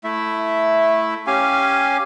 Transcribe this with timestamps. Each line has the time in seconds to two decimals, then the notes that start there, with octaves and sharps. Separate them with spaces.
0.04 A3 E4 E5
1.27 C#4 G4 F5 G#5